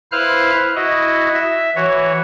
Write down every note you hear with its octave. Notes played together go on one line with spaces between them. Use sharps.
E4 B4 C5 F5 F6 F#6
E4 F#4 D#5
E5
E3 F#4 C#5